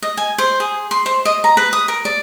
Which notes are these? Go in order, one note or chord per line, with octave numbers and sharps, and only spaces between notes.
D#5
G#5
C5
G#4
C6
C5
D#5
A#5
B4
D#6
A#4
D5